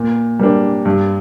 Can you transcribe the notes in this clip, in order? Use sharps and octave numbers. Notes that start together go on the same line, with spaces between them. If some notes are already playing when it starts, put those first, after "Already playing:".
Already playing: A#2
G3 A#3 D4
G2